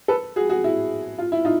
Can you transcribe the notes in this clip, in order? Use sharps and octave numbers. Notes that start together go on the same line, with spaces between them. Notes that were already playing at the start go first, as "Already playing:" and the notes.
A4 B4
F#4 G#4
F#4 G#4
E4 F#4
F4
E4
D#4 F4